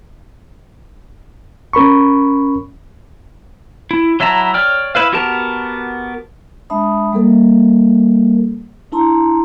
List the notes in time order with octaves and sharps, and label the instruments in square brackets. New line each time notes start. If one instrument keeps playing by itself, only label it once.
[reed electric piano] C#4 A#4 B5 C#6
[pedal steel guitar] E4
F#3 E4 E5 A5 A#5
C#5 D5 G5 F6
E4 B4 F5
B3 F#4 G4 A#4 A5
[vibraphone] G#3 D4 E5 A5 B5 D#6
G3 A#3 A4 A#4
D4 E4 A5 A#5 C6